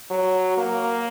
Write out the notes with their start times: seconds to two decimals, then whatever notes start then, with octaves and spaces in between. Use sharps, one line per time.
0.10 F#3
0.58 A#3